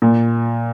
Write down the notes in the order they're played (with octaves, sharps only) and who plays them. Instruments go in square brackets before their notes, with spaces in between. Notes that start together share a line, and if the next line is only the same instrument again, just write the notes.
[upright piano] A#2